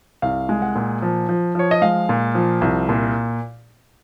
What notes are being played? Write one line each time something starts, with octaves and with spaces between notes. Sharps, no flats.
C2 F5
G#3
F#5
A#2
F3
F3
F3 C#5
D#5
G#3 F5
A#2
F3
C2
A#2